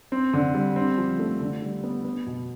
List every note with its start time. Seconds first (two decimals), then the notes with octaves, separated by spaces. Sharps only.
0.12 C4
0.34 D3
0.54 G3
0.76 C4
0.98 F3
1.19 A3
1.41 D3
1.62 G3
1.84 B3
2.05 B3
2.26 B2